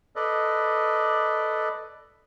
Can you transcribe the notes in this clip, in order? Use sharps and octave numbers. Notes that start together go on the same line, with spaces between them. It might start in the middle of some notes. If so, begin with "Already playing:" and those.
A4 B4 D5 D#5